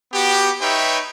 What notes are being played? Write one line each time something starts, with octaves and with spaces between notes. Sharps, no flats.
B3 F#4 G4
D#4 B4 C#5 E5 G5